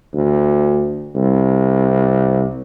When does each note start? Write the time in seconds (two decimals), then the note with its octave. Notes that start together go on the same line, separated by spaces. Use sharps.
0.14 D2
1.15 C2